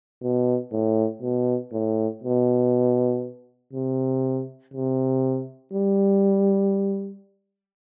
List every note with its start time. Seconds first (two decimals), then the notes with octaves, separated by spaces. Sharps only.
0.23 B2
0.72 A2
1.22 B2
1.73 A2
2.24 B2
3.73 C3
4.74 C3
5.74 G3